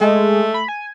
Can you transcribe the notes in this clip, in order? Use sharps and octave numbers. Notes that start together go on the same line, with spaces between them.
G#3 A3
B5
G#5